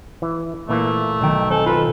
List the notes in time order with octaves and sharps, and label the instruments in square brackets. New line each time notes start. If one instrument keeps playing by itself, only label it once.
[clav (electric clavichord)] E3
[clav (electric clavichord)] A#2 E3 A#3 [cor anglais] A3
[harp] B1 D#3 G5
[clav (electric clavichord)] C4 G#5 A5 [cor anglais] A4
[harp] F4 A4 [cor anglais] B4